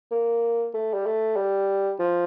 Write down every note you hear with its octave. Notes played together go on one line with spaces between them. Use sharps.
A#3
A3
G3
A3
G3
F3